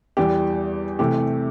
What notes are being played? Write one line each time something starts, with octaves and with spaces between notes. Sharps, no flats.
E2 E3 G3 G4
C3 E3 A3 G4